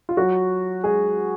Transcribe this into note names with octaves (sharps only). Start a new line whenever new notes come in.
F4
F#3 F#4
G#3 G#4